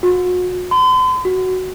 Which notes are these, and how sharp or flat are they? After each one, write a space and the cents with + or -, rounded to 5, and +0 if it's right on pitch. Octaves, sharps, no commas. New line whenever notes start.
F#4 -40
C6 -45
F#4 +5